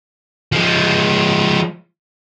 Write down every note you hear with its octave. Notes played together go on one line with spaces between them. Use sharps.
F3 G#3